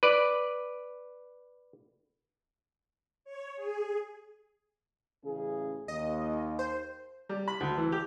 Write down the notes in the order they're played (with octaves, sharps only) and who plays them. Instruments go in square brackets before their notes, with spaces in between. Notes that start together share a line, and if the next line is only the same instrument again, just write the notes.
[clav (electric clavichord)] B4 D5
[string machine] C#5
G#4
[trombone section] A1 C#3 G#4
[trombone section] D#2 [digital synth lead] D#5
[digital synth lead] C5
[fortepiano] G3
B5
D2
E3
G4